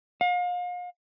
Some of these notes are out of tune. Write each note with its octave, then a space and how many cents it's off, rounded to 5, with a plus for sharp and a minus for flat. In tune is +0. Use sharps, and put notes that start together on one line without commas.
F5 +40